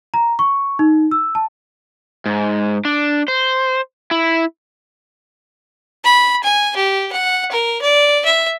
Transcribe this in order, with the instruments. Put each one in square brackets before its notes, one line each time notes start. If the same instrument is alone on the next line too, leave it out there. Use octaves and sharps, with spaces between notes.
[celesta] A#5
C#6
D#4
E6
A5
[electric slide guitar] G#2
D4
C5
E4
[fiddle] B5
G#5
G4
F#5
A#4
D5
E5